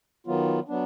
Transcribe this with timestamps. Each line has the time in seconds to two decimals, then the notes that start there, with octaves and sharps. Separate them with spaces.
0.27 D#3 F#3 B3 F4
0.68 F#3 B3 D4